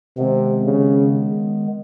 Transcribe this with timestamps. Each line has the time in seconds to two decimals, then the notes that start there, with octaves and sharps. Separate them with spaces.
0.17 C3 D#3 G#3 B3
0.64 C#3